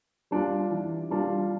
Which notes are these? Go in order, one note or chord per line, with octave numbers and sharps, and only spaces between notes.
G3 D4 F4
E3
G3 D4 F4